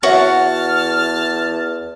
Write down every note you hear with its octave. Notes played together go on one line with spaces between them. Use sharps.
E2 F#4 C#5 E5 F#5 A5 F6